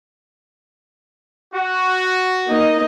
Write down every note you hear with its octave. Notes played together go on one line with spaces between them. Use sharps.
F#4
A#3 D#4 D#5